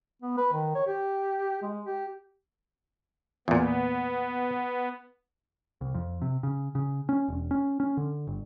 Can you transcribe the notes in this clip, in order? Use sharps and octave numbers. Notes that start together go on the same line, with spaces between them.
B3
B4
D#3
C#5
G4
G#3
G4
E2 A#2 B3
C2
F2
C3
C#3
C#3
C#4
E1
C#4
C#4
D3
G1